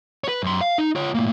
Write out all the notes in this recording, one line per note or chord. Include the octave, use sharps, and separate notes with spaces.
B4 C#5
F#2 C6
F5
D#4
F4 C#5
A2 A#3